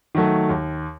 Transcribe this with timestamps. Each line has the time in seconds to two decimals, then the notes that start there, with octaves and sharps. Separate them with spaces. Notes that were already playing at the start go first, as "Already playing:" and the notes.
0.15 D#3 F#3 A3
0.49 D#2